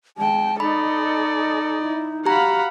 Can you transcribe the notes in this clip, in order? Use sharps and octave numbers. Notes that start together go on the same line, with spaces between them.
G#3 G5 A5
D#4 A4 D5 D#5 B5
E4
F#4 G4 F5 F#5 A#5 B5